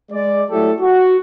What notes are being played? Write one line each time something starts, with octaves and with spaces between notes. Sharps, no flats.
G#3 D5
F#3 A3 E4 G4 A4
F#4